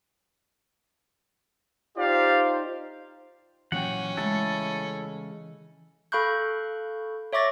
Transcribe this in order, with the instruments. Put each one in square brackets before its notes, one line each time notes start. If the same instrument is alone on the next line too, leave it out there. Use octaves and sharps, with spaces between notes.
[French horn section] D#4 F4 C5 [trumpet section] G4 D5 F5
[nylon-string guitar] A#2 F#3 [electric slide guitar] E3 G5 [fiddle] C#4 [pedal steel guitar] F#5
[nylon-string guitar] C#3 G#3 A3 [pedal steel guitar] E4 A4
[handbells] A4 F5 B5 C#6 F#6 G6
C#5 E5 C#6 D6 A6 A#6